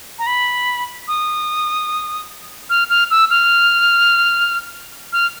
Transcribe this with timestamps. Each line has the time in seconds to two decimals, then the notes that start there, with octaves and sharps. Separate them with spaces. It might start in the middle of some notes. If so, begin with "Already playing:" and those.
0.19 A#5
0.27 B5
1.08 D#6
2.70 F6
2.90 F6
3.11 E6
3.30 F6
5.13 F6